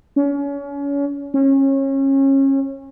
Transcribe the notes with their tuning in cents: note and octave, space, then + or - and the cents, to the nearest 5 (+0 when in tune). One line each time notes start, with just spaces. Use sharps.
C#4 +30
C#4 -30